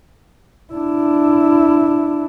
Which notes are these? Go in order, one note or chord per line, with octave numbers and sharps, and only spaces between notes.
D4 E4